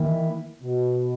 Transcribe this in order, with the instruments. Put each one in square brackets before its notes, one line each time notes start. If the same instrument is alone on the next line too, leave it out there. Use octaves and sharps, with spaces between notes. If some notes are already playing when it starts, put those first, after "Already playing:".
Already playing: [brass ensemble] D#3 [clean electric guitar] E3 A#3 E4
[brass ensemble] B2